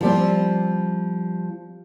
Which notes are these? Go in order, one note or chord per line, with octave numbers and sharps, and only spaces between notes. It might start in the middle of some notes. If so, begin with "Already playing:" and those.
F3 G3 C4